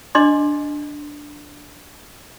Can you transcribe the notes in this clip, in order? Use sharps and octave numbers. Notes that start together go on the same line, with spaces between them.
D4 D#5 C6 D6